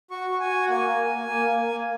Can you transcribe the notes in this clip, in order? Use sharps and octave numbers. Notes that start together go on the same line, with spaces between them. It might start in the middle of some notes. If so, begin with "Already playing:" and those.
F#4 C#6
F#4
G#5
F#4
F#5
A#3 G#5
A#3
A#3
A#3
A#3
A#3